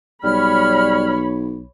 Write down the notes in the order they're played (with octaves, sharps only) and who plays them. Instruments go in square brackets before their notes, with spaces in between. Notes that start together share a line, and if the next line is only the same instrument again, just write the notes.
[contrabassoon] B1 [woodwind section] G3 F6 [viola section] C#5 B5